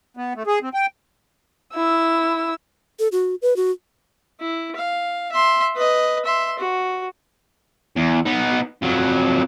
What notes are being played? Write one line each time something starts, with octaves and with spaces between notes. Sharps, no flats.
B3
A3
G#4
C4
G5
E4 E6
A4
F#4
B4
F#4
E4
F5
E5 C6
B4 D#5
E5 C6
F#4
E2
B3 D#4
F2 F#3